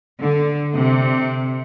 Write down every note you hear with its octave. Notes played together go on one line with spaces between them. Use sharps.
D3
C3